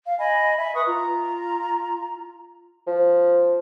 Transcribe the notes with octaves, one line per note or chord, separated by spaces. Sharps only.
F5
D#5 G#5 B5
E5 B5
B4 C#6 D#6
F4 A#5
F3